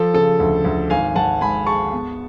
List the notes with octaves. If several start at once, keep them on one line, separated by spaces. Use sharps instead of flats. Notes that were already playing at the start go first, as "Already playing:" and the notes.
Already playing: F3 A4
C#3 A4
D2
D2
G#1 F5 G#5
G#1 F#5 A5
G#2 G#5 B5
G#3 A5 C#6
B3